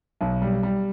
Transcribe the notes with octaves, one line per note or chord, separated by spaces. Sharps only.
B1
G3
G3